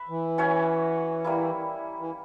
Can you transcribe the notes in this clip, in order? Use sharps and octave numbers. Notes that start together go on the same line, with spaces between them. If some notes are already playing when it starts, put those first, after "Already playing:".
Already playing: B4 E5
E3
C#4 F#4 C#5 E5
G3 A#3 E4
E3